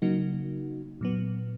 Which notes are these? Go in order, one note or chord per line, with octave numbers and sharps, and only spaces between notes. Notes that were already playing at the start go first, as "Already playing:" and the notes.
C#3 F#3 A#3 D#4 F#4
A#2 F#3 B3